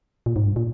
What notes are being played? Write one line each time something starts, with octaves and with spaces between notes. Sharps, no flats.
A#2
G#2
G2
A#2